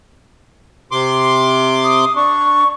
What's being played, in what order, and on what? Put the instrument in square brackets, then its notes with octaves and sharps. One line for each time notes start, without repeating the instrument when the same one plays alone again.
[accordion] C3 C6 D6
[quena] D#6
[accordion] D4 [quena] C#6